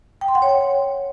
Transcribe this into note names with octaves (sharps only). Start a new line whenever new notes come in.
G5
C6
F#5
C#5
G5